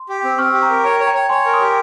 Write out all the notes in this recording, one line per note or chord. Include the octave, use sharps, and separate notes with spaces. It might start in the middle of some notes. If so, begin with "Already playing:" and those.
Already playing: C6
G4
C4
C4 C#6 F6
G4
A#5 C#6
A#4
C#5 G5 A#5
C#5
G5 A#5
C#5
C#5 G#5 C6
A#4
C6 D#6
G4